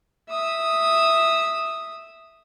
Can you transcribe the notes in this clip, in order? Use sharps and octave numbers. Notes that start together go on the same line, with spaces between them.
E5 D#6